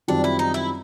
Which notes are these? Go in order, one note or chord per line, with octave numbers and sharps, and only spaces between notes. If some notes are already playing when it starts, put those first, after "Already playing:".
F#2 D#3 G3 C4 D4 F4
E4
D#4
E4